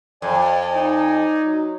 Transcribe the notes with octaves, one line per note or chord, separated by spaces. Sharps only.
F2 D5 G#5
D#4
F#3